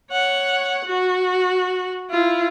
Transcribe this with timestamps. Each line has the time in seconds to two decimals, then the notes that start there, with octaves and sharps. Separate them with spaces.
0.11 C#5 F#5
0.85 F#4
2.10 E4 F4